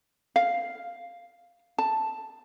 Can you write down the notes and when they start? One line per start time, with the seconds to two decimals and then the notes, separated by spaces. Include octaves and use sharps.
0.36 F5
1.78 A5